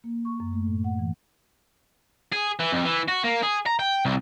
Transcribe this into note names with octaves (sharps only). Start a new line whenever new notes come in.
A#3
C#6
F#2
A3
A2
F#5
E3
G#4
E3
F2
E3
F#4
A#3
G#4
A#5
G5
C2